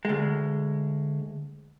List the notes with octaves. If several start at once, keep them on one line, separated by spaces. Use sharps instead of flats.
D2 G#3